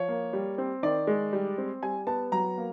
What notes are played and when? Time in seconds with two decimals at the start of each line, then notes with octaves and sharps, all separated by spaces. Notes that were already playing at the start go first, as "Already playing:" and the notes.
Already playing: F3 C#5
0.09 A#3
0.33 G3
0.58 C4
0.83 D#3 D5
1.07 G#3
1.33 G3
1.58 C4
1.83 G3 G#5
2.07 B3 A5
2.32 F#3 A#5
2.58 A#3